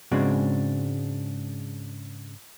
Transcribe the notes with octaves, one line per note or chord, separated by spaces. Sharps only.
G#2 C#3 G#3 C4 D4 F#4